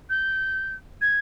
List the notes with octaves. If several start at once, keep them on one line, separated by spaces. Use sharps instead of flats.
G6
G#6